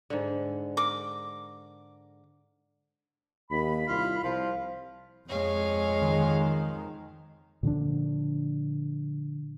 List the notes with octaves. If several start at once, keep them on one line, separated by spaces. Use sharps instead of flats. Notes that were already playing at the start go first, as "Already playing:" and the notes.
G#2 D3
A#4 D6
D#2 B5
C2 F4
C2 F3
F2 G#3 C#5 F5
D#3
A#2 D3 F3 D4